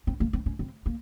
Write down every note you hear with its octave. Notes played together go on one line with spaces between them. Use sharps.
C4
A#3
C4
C#4
C4
A#3